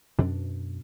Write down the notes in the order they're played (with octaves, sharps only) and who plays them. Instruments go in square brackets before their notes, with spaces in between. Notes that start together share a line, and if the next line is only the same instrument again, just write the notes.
[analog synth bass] F#2 [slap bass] B2 D4